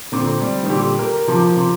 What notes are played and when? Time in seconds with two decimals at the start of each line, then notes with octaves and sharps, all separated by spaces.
0.12 A#2 D3 C4
0.42 G3
0.63 D#3
0.70 A#2 D3 G4
0.99 A#4
1.28 C3 F3
1.56 C3